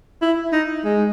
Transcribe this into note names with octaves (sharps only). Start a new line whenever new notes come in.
E4
D#4
G#3